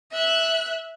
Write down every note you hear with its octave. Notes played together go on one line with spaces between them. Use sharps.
E5 F#6